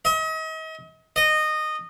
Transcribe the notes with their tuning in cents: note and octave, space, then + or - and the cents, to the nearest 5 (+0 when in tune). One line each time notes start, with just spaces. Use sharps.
D#5 +40
D#5 -15